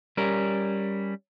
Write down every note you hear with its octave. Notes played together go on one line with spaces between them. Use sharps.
G3 C#4 A#4